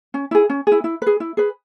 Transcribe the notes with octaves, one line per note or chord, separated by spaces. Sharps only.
C#4
E4 G#4
C#4
E4 G#4
E4
G#4 B4
E4
G#4 B4